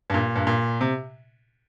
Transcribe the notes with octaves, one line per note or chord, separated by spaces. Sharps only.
G2
A#2
G2
A#2
C3